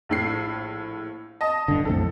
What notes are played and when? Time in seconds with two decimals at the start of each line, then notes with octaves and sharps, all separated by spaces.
0.09 A#1 A2 C7
1.41 D#5 A5
1.68 G2 D3
1.85 B1 F2 A2 A4